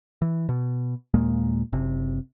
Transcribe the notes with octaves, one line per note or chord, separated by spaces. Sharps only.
E3
B2
D#2 A#2 G#3 A#3
F#1 C3